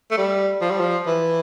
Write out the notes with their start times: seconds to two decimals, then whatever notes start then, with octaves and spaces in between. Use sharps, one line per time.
0.11 A3
0.17 G3
0.61 F3
0.71 G3
0.80 F3
1.07 E3